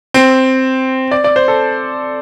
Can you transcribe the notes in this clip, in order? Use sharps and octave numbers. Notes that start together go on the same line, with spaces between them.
C4
D5
D5
C5
A4